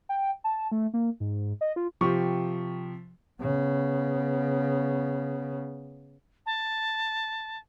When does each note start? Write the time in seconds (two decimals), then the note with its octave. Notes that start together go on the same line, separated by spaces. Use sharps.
0.09 G5
0.44 A5
0.72 A3
0.94 A#3
1.20 G#2
1.61 D#5
1.76 F4
2.01 C3 F3 G4 C#6
3.41 C#3 B3
6.46 A5